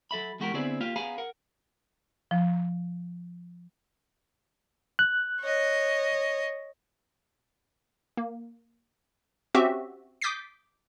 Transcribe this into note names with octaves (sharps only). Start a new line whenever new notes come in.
F#3 A4 E5 B5
E2 G#3 F#4 G4 A4 A#4
D3 B3 C4 E4 G#4 D5
A#3 F4 G4 F5
B3 G#4 F5 G#5 A#5 B5
A#4 F#5
F3
F#6
C#5 D#5
A#3
C4 C#4 F#4 G4 E5
D6 D#6 G6 A6 B6 C7